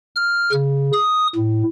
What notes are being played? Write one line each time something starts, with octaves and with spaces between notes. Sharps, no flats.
F6
C#3
D#6
A2